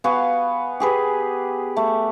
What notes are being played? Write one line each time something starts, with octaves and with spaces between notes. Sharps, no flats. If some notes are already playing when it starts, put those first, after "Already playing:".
B3 F#4 F5 G#5
G4 G#4 B4
A3